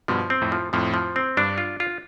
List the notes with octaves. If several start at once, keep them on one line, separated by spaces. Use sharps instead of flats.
G2 B2 F3
C4
F2 A2
F3
F2 A2 F3
F3
C4
G2 D4
F4
F4